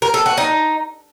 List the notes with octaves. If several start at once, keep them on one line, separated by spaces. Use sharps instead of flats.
A#4
A4
F#4
D#4